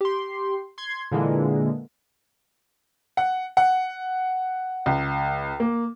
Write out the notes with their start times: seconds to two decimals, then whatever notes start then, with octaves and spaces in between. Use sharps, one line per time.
0.01 G4 C6
0.78 C6 G#6
1.12 A#2 D3 E3 G#3 A#3
3.17 F#5
3.57 F#5
4.86 C#2
5.60 A#3